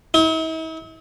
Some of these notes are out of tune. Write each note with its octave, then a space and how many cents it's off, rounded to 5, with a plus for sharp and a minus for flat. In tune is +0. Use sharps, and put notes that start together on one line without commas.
E4 -45